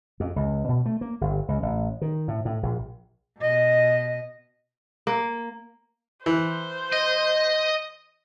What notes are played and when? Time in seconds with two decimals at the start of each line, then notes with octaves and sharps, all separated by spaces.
0.20 F2
0.36 C#2
0.69 B2
0.86 A3
1.01 A#3
1.21 G1
1.48 C#2
1.62 A1
2.01 D#3
2.28 A2
2.45 A2
2.63 A#1
3.39 B2 D#5
5.07 A#3
6.26 E3 C5
6.92 D#5